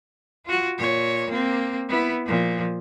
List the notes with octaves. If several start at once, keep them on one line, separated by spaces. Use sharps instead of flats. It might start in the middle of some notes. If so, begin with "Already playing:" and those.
F4 F#4
A#2 C#5
A#3 C4
B3 E4
A#2 F3